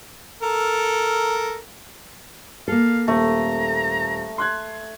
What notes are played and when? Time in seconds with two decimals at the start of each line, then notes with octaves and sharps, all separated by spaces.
0.42 A4 A#4
2.68 A#3 A4 F5
3.08 D#1 A3 A#5
4.38 C6 F#6 G#6